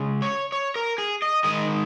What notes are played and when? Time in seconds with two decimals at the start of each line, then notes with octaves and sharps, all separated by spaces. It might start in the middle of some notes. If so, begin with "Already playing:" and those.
Already playing: C#3 G#3
0.22 C#5
0.52 C#5
0.76 A#4
0.98 G#4
1.22 D#5
1.44 D#3 G#3 D#4 D#5